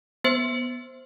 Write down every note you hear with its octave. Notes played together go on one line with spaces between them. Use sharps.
B3 C5